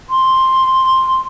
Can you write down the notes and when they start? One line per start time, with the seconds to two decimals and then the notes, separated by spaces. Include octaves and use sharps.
0.10 C6